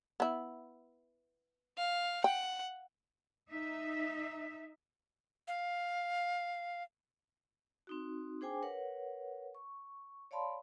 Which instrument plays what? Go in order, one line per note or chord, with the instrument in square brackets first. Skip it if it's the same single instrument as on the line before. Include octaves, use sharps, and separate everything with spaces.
[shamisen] B3 E4
[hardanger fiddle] F5
[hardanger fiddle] F#5 [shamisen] G5
[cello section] D#4 E5
[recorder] F5
[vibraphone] C4 D#4 F#4
D4 G#4 C5 G5 G#5 D6
A#4 B4 C#5 F#5
C#6
C#5 D5 F5 A5 B5 C6